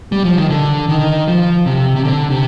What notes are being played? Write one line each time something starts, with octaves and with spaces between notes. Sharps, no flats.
G3
F3
D#3
D3
D#3
F3
C3
C3
D3
C3